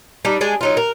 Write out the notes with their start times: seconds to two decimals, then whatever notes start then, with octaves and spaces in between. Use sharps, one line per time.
0.25 G3 D4 D#4
0.41 G#3 D4 G#4
0.61 F#3 D#4 F4
0.77 A#4